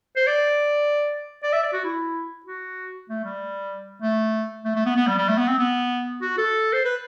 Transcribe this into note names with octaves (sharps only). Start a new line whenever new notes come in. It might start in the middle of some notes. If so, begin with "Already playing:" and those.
C5
D5
D5
E5
D5
F#4
E4
F#4
A3
G3
A3
A3
A3
B3
B3
G3
G3
A3
B3
C4
B3
F#4
A4
C5
B4